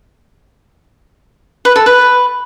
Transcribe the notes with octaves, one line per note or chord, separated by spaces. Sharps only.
B4
A4
B4